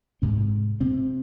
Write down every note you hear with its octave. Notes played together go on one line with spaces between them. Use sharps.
G#2 C3 C4
C3 C4